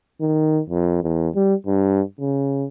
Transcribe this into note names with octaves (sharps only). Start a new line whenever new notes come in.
D#3
F2
E2
G3
G2
C#3